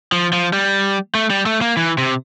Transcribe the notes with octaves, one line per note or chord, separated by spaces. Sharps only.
F3
F3
G3
A3
G3
A3
A#3
E3
C3